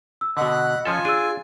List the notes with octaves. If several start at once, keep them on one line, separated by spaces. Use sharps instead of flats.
E6
B2 D3 D#5 F#5 B5 F#6
F3 C#4 F4 A4 G#5
D4 G#4 E6 D#7